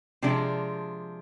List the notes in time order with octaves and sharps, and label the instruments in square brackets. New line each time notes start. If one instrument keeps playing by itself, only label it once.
[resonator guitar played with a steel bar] C3 F3 G#3 D4